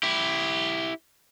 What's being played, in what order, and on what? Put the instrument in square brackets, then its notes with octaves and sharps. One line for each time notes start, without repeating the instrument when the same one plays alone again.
[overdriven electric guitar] E4 G4